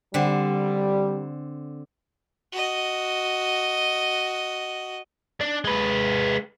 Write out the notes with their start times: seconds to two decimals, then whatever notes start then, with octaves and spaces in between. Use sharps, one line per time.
0.14 D3 G3 C4
2.52 F#4 D#5
5.41 D4
5.65 G#3 B4